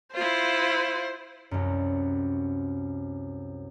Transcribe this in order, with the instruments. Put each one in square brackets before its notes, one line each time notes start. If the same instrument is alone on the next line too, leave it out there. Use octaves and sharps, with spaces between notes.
[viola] E4 F4 [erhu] C5
[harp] C2 F#2